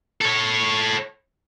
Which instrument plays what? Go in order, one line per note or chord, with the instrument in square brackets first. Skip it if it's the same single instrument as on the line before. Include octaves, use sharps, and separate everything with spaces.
[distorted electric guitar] A4 C#5